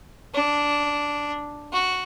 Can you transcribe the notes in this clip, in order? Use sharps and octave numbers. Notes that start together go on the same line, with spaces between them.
D4
F#4